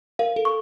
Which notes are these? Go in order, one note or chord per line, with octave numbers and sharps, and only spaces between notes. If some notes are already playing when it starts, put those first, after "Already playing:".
A#4 F5
A4
C#6